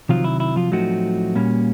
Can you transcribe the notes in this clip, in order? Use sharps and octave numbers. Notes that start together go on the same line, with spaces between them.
C3 D#3 F3 F#3 F4
E4
E4
F3 F4
A2 F3 F#3 A3 C4 D#4 F#4
A#2 G3 A#3 C#4